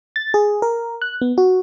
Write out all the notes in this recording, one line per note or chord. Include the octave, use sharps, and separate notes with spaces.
A6
G#4
A#4
F#6
B3
F#4